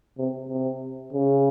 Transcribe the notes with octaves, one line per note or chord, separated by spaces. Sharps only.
C3
C3
C#3